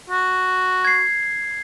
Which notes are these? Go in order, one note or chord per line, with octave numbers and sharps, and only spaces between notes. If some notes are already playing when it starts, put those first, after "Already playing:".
F#4
G#6 C7